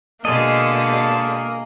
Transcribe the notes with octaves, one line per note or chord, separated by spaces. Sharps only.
B2 D3 G#3 A#3 G#4 D#5 A5